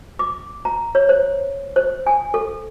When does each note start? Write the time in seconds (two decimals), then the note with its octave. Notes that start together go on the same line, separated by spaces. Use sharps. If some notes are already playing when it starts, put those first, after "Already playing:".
0.19 D6
0.65 A#5
0.95 C#5
1.09 C5
1.76 C5
2.07 G#5
2.34 A4